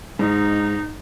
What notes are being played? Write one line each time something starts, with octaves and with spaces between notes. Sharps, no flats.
G#2 D#4